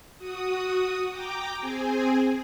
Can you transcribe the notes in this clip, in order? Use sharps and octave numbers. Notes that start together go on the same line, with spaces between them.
F#4 D#6
G5 A#5 D6
C4 G#4 G#5